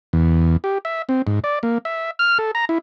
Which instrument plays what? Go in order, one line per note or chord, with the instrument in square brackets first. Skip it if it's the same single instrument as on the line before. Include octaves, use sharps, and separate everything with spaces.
[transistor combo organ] E2
G4
E5
C4
G#2
D5
A#3
E5
F6
A4
A#5
E4